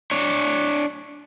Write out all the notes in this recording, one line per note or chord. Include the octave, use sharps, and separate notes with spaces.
D4 C#5